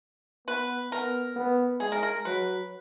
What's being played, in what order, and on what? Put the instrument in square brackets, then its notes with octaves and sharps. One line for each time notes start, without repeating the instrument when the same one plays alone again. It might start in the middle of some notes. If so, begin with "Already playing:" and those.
[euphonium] B3 [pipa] B4
[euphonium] B3 [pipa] A#4
[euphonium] B3
[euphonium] G#3 [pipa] G#4
[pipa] A#4
A#4
[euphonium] F#3 [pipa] B4